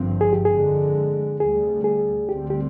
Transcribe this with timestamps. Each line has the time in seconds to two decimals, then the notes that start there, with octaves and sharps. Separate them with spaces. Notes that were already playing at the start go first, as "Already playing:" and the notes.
Already playing: G#1 G2 D3 F3 C4
0.21 G#4
0.33 G4
0.45 G#4
0.50 F2 D3 G#3
1.40 D2 C3 G3 G#4
1.84 G#4
2.29 D2 D3 G3 C4 G4
2.50 G4